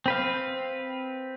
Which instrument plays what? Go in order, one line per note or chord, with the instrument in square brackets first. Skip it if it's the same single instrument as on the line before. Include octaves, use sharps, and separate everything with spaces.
[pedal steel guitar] C4 B4 F5